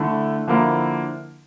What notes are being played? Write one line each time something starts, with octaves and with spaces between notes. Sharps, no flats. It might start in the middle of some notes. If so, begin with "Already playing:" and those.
Already playing: D3 A3 E4
D3 F3 A#3 E4